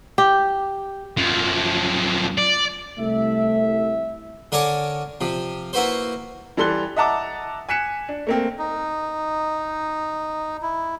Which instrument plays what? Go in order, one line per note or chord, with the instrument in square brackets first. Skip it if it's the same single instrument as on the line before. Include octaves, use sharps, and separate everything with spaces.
[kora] G4
[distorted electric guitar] F#2 F3
D5
[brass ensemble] C2 E5 [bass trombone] A3
[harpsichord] D3 A#4 C#5 D5 G#5 D6
C3 F3
A#3 E4 F#4 B4 C5
[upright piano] E3 G3 A4 C6 F#6 G7
D#5 E5 F#5 A5 A#5 D6
G#5 F#6 B6 C#7 E7
D4
A3 A#3 C4
[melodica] D#4
E4